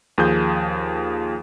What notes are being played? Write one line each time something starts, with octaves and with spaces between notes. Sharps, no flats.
D#2 F3 G#4 G6